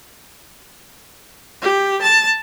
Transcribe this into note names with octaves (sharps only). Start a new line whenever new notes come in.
G4
A5